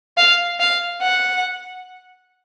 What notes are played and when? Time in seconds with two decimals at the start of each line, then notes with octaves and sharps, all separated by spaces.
0.18 F5
0.60 F5
1.03 F#5